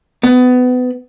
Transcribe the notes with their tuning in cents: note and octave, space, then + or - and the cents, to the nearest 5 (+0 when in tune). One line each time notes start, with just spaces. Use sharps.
B3 +25